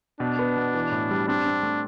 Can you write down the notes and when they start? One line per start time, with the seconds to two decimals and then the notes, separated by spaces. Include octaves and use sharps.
0.20 B2 D4
0.39 B3
0.57 B2
0.74 E3
0.92 A2
1.10 G3
1.28 C4 D4
1.45 C4
1.63 A3